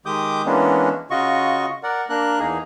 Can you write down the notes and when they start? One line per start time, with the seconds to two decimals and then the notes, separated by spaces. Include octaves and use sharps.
0.06 D#3 G#3 G4 D6 D#6 G6
0.46 E3 G#3 A#3 B3 C#4 D4
1.11 C#3 F4 F#4 D#5 C#6
1.83 A#4 D5 F#5
2.09 A#3 D4 A#4 F#6
2.39 E2 A#3 D#4 G#4